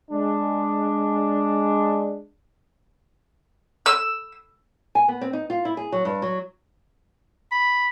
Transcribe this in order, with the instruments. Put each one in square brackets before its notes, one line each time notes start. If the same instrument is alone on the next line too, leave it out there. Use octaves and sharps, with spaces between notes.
[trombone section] G#3 D4
[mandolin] E6
[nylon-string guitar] G#5
B3
C4
D#4
F4
E4
G#4
F#3
G2
F#3
[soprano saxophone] B5